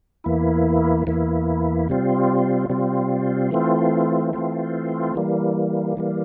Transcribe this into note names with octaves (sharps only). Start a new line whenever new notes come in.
E2 E3 A#3 E4
E2 E3 A#3 E4
C3 G3 C4 F4
C3 G3 C4 F4
E3 A3 C4 F4
E3 A3 C4 F4
E3 G3 A#3
E3 G3 A#3